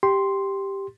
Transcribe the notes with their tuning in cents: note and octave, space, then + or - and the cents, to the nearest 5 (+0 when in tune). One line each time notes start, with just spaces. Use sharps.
G4 +0 C6 +0